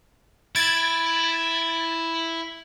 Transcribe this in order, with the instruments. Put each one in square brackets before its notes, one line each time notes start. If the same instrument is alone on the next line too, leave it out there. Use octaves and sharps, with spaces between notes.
[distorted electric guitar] E4 [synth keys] G#6 A6 D7